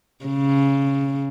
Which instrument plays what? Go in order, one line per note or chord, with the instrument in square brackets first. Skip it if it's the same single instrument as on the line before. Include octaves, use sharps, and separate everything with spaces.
[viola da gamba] C#3